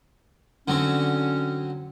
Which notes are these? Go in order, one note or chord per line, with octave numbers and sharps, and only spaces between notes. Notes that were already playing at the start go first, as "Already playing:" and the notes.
D3 F#3 C4 C#4